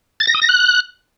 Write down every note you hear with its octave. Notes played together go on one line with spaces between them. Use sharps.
A6
A#6
D#6
A#6
F#6